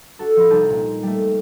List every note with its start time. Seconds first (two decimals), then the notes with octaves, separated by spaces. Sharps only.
0.19 D4 F#4 A4
0.36 F3 D#5 B5
0.50 C2 D#4 A5 G6
0.70 A#2
1.03 G3 A3